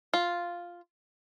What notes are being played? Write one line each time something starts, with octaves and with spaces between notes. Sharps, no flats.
F4